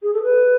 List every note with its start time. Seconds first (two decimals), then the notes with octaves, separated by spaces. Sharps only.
0.02 G#4
0.13 A4
0.23 B4